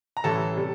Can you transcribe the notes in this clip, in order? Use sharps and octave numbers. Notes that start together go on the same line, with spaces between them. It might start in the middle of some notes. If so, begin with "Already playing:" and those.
A#5
A1 A2 E3 G3 A4 A5
C3 G3